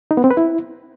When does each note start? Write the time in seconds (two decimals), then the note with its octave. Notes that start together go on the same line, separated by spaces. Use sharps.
0.11 D#4
0.17 B3
0.24 C4
0.31 B4
0.37 E4